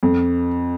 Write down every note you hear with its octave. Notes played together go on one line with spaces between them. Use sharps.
F2